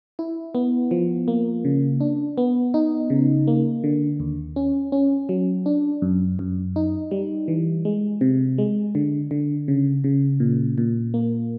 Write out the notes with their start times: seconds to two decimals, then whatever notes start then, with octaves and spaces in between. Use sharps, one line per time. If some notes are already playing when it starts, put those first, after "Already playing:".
0.19 E4
0.55 B3
0.91 F3
1.28 A#3
1.65 C#3
2.00 D4
2.38 B3
2.74 D#4
3.10 C#3
3.47 A#3
3.84 D3
4.20 D#2
4.56 C#4
4.92 C#4
5.29 F#3
5.66 D4
6.02 F#2
6.39 F#2
6.76 D#4
7.11 G3
7.48 E3
7.85 G#3
8.21 C3
8.58 G#3
8.95 D3
9.31 D3
9.68 C#3
10.04 C#3
10.40 A#2
10.78 A#2
11.14 A#3